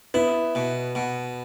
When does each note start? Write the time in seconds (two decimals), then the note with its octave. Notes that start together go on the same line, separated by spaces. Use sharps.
0.14 B3 E4
0.55 B2
0.95 B2